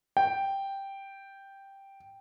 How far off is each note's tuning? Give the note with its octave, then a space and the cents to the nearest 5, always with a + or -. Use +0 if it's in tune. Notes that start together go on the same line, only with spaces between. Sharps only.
G5 +0